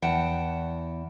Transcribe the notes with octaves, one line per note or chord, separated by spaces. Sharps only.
E2 F#5 G5 A5